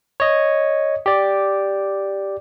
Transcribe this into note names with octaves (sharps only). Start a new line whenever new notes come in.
C#5 D#5
G4 D5